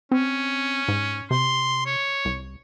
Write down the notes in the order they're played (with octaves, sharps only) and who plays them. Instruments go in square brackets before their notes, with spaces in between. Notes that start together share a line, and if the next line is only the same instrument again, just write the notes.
[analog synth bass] C4 [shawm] C#4
[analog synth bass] G#2
[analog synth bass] C3 [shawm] C6
[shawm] C#5
[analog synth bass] C2